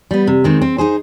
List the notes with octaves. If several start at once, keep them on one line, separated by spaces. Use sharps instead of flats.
G3 B3
C3
D#3 G#3 C4
C4
D#4 G#4 C5